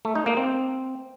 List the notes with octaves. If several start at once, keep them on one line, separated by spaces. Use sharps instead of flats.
A3
D#4
A#3
C4